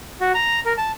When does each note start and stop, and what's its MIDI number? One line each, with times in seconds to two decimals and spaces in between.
0.21 0.32 66
0.35 0.60 82
0.66 0.73 70
0.77 0.92 81